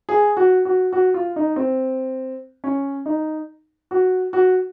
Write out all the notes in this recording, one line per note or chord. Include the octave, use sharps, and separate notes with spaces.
G#4
F#4
F#4
F#4
F4
D#4
C4
C#4
D#4
F#4
F#4